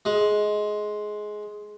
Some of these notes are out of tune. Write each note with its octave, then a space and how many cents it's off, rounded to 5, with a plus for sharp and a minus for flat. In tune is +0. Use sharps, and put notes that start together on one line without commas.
G#3 +15